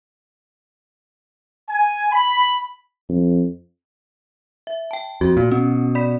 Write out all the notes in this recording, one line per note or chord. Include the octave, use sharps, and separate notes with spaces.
G#5
B5
F2
E5
G5 A5
F2 F#4
A#2
B2 C#4
D5 B5 B6